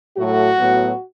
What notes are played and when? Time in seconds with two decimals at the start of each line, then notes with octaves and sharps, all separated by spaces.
0.17 A2 F#3 A3 F#4
0.58 A2 F#3 B3